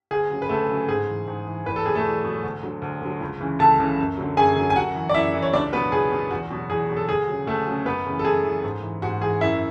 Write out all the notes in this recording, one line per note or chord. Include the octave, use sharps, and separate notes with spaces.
D2 G#4
C#3 F#3
B4
D2 A3 A4
C#3 F#3
G#2 G#4
E3
G#2
E3
E2 B4
A4
B2 F#3 G#4
A3 A4
E2
B2 F#3
D2
D3 F#3
D2
D3 F#3
C#2
C#3 E3
C#2 A4 A5
C#3 E3
F#2
D3 F#3
F#2 G#4 G#5
D3 F#3
G#5
F#2 F#4 F#5
E3
D5
F#2 E4 E5
E3
C#5
C#2 D4 D5
B2 F#3 B3 B4
C#2 G#4
B2 F#3
E2 F#4
B2 F#3
E2 G#4
B2 F#3
A4
D2 G#4
C#3 F#3
D2 A3 A4
C#3 F#3
F#2 B3 B4
C#3
E3
A4
F#2 G#4
C#3 E3
G#2
E3
G#2 F#4
E3 G#4
F#2 E4 E5